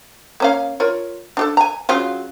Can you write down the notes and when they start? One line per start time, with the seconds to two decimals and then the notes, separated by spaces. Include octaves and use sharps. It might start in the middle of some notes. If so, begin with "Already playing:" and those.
0.40 A#3 C#4 F5
0.80 F4 A#4 C#5
1.37 D4 G4 A4
1.57 G#5 A#5
1.89 C#3 F#3 F4